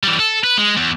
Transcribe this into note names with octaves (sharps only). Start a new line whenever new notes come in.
E3 G3
A4
B4
G#3
E2